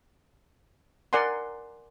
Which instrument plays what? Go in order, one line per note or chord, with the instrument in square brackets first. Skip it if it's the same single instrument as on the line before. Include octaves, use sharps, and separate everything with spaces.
[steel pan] A#4 D5 F#5 G#5 C6